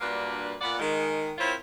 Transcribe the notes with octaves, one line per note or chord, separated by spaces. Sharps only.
G2 A#2 A#3 D4 F#4 B4
A#2 B3 D5 F#5
D#3 G#3
C4 E4 F4 A#4 C5 C#5